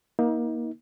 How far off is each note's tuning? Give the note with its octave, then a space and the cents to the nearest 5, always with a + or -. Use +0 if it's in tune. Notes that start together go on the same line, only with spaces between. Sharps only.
A#3 +25 D#4 +35